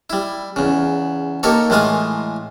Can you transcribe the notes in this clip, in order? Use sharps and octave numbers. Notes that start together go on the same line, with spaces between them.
G3 E4
E2 C#3
A#3 D#4 G4 A4 C#5
A2 E3 G#3 F4 F5 D#6